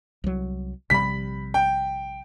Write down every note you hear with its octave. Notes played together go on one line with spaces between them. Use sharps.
C2 F#3
A#1 C3 G3 B5 B6
G5